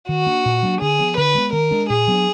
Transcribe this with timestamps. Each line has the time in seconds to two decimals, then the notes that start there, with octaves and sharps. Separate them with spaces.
0.09 D#3 F#4
0.26 A#3 D4
0.46 A#2
0.63 F#3 A#3 D4
0.81 D3 G#4
0.99 F3 B3
1.17 D3 B4
1.35 G#3 B3
1.53 D#3 A#4
1.71 G#3 D4
1.89 A#2 G#4
2.08 F#3 B3 D4